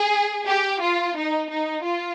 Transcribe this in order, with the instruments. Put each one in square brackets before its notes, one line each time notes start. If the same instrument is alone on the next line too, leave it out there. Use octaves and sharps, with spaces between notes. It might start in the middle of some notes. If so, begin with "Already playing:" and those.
Already playing: [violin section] G#4
G4
F4
D#4
D#4
F4